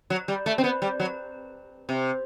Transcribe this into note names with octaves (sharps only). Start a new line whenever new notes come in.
F#3
G3
A3
C4
B3
G3
F#3
C3